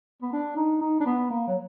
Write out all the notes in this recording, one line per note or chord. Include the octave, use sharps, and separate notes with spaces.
B3
D4
D#4
D#4
D4
B3
A#3
F#3